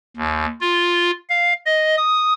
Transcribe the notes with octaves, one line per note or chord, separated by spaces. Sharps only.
D#2
F4
F5
D#5
D#6